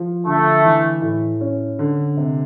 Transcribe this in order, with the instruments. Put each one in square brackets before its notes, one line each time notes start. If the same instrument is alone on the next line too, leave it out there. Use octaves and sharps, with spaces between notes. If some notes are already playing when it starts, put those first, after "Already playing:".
Already playing: [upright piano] F3
[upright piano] D3 [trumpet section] A3
[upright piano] E3
A2
C#4
D3
C3